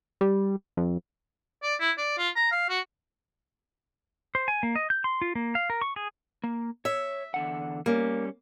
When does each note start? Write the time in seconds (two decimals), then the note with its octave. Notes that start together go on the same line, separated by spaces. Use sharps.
0.21 G3
0.77 F2
1.63 D5
1.80 E4
1.98 D5
2.18 F4
2.36 A#5
2.51 F5
2.69 F#4
4.35 C5
4.48 G#5
4.63 A#3
4.76 D#5
4.90 G6
5.04 C6
5.22 F4
5.35 A#3
5.55 F5
5.70 A#4
5.82 C#6
5.96 G#4
6.44 A#3
6.85 C#5 E5
7.34 E2 D3 F#5
7.86 G3 A#3 C#4